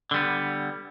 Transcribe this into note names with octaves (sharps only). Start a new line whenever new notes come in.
D3 G3 B3